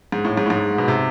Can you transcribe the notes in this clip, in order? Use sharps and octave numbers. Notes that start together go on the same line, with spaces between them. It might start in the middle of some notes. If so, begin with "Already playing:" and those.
G#2
A2
G#2
A2
G#2
B2
C3